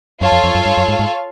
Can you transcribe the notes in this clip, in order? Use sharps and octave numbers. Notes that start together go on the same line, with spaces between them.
F#2 F4 A4 C#5 F5
F2
F2
F#2
G2
F#2
G#2
G#2